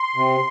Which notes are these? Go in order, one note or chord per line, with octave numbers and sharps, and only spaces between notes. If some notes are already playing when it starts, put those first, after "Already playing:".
Already playing: C6
C3